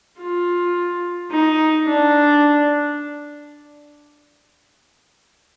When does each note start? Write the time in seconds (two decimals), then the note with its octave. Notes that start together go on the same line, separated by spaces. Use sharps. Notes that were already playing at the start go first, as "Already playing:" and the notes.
0.20 F4
1.31 D#4
1.87 D4